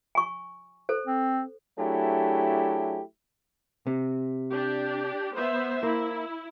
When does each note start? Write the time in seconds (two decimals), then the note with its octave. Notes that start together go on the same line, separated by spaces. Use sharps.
0.15 G#5 C#6
0.89 A4 C5
1.07 C4
1.79 F#3 A3 D4 E4 G4 G#4
3.87 C3
4.52 D4 G4
5.34 B3 C5 E5
5.83 A#3 E4